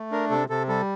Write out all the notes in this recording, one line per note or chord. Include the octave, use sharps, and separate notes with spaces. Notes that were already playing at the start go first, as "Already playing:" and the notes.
Already playing: A3
D4 A#4
C3 A4
C3 A4
G3 A4